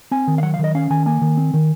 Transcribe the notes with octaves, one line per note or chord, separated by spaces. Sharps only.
C4 G#5
D#3
F5
F#3 F#5
F5
D#3
D#5
C#4 F5
D#3 G#5
A#3 G#5
D#3
C4
D#3